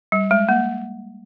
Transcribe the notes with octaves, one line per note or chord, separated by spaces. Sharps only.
G3
G#3
A#3